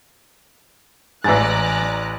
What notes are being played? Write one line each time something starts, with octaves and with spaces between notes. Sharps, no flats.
A1 G#2 E3 D5 G#5 A#5 F#6 A6